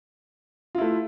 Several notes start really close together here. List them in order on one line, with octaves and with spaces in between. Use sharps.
F4 E4 A3